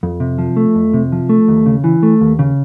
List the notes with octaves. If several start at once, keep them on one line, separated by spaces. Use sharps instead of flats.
F2
C3
F3
A3
F2
C3
F3
A3
D#2
C#3
E3
A3
D#2
C#3